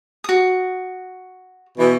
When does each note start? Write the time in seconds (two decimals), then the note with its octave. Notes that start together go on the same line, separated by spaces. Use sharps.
0.24 F#4 D#6
1.78 B2 E3